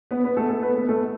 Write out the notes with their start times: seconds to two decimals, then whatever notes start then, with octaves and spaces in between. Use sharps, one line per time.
0.11 B3 B4
0.24 B3 B4
0.37 A3 A4
0.50 A3 A4
0.62 B3 B4
0.75 B3 B4
0.88 A3 A4